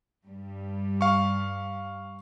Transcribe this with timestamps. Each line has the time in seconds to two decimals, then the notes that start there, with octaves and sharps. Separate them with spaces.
0.24 G2 G3
1.01 F5 C#6